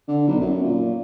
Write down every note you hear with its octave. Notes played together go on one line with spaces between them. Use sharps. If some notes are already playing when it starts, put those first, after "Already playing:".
D3
B1
F#2
A#2